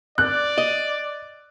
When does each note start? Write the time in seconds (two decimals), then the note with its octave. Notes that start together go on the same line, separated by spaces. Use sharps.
0.18 D5 F#6
0.58 D#5